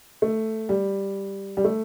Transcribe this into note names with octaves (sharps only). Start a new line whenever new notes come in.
A3
G3
G3
A3